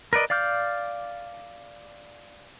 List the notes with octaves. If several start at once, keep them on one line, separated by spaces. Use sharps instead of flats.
A#4 B4 D5 D#5
D5 F5 D6 F6 G6